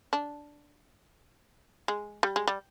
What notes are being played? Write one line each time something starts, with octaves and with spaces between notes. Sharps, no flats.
D4
G#3
G3
G#3
G3